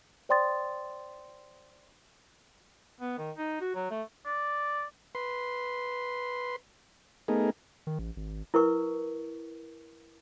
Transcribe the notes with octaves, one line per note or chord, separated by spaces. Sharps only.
C5 D5 G5 C6 D#6 A6
B3
D#3
D#4
F#4
F#3
A3
D5
B4 C6
A3 B3 D#4 G#4 A#4
D#3
A1
G#1
E4 A#4 B4 C#6